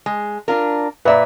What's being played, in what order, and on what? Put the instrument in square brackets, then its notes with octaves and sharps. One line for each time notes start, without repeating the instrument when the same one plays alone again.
[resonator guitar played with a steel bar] G#3
D4 F4 A#4
[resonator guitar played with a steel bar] A#2 E5 [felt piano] B4 D5 A#5